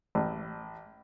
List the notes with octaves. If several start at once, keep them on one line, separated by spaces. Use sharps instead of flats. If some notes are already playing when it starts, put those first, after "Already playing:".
A1